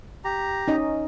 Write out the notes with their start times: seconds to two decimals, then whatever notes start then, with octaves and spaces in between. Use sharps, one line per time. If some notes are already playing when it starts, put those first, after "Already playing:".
0.24 G4 A#5
0.68 C#4 D#4 D#5